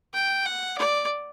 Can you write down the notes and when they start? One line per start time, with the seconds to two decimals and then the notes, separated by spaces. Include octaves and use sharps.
0.14 G5
0.46 F#5
0.78 D5